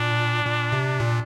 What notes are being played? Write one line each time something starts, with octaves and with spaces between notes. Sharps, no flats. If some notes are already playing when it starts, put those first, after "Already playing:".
Already playing: A#2 D4
A#2
C3
A#2